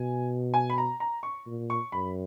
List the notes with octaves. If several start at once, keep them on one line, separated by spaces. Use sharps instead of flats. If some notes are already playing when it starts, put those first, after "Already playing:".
Already playing: B2 G#5
G#5
B5
A#5
A#5
C#6
A#2
C#6
F#2 B5